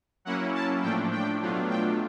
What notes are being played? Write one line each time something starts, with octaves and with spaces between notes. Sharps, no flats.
F#3 A#3 C#4 E4 F#5
A5
A2 F3 A3 D4 G5
G5
B2 F#3 A3 D4 F4
G5